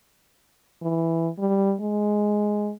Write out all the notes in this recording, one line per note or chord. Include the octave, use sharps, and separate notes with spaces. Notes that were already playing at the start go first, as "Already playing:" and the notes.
E3
G3
G#3